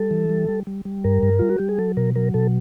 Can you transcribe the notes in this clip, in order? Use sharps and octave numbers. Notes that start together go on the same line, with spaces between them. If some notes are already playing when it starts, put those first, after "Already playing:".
Already playing: G3 A4
E3
G3
G3
G3
G3
G2 A#4
G2
G3 F4
F#4
G3 G4
G#4
F#3 A4
B2 A#4
F#3 A#4
B2 A4